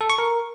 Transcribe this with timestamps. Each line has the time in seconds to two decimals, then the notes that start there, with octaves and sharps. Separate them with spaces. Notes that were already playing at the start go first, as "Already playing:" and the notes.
0.01 A4
0.10 C#6
0.18 A#4